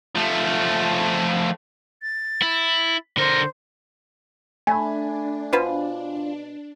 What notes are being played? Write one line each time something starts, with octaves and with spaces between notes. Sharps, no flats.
F3 A3
A6
E4
D3 A#4 C5
A3 D4 G#5 B5
B2 F4 B4 C5